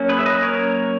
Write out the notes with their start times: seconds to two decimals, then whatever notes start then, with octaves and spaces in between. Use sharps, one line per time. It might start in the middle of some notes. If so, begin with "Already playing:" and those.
Already playing: F#3 A#3 C#4
0.09 G#4 B4
0.19 E5
0.25 B4 D#5
0.43 A#4 C#5